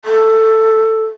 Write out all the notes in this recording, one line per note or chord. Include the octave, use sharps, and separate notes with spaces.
A4